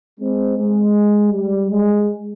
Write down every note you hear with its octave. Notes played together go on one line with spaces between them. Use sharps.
G#3 C4
G#3
G3
G#3